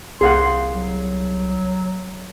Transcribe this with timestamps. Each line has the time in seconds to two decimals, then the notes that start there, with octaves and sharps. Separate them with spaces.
0.21 C2 G#4 F5 F#5 C6
0.73 F#3